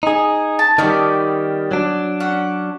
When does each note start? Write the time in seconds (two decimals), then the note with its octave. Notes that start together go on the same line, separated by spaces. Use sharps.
0.03 D#4 G#4
0.59 A5
0.78 D#3 G3 B3 C#4 D5
1.71 F#3 D4
2.20 C#4 F#5